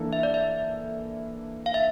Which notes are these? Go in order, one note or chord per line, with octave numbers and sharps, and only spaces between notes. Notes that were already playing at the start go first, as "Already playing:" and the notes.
Already playing: E3 A#3 D4 A4
E5
D5
E5
F5
E5